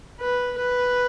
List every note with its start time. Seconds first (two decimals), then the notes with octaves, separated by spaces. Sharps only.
0.20 B4
0.58 B4